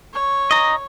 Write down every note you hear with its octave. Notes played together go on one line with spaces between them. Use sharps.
C#5
D#5 A#5